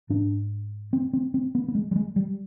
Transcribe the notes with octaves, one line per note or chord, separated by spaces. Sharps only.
G#2 D4
C4
C4
C4
B3
B3
G#3
G3
G#3
G3